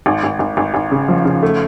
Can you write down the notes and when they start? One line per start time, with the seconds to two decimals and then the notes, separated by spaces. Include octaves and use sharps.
0.06 G#1
0.23 G#1
0.39 G#1
0.57 G#1
0.74 G#1
0.91 C#3
1.08 F3
1.25 C#3
1.43 A3